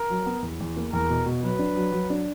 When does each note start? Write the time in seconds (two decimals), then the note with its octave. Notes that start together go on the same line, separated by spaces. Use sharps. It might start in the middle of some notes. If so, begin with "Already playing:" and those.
Already playing: A#4
0.10 F#3
0.26 B3
0.42 E2
0.60 E2
0.77 A#3
0.93 E2 A#4
1.10 B2
1.26 B2
1.43 F#3 B4
1.59 D4
1.76 F#3
1.92 F#3
2.10 D4